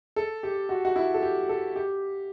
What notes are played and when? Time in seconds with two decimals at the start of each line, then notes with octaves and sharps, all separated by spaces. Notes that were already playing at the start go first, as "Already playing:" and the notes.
0.16 A4
0.43 G4
0.69 F#4
0.85 F#4
0.96 E4
1.14 A4
1.22 G4
1.49 A4
1.76 G4